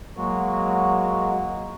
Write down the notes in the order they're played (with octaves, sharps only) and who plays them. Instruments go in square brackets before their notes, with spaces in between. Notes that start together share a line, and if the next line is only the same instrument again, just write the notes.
[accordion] F#3 G#3 A#3 F#4